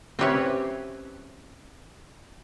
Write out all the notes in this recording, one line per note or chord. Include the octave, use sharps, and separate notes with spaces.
C4 C#4 E4 G4 B4 C#5